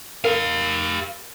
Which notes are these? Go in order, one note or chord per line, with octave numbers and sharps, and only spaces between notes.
G4 A#4 F5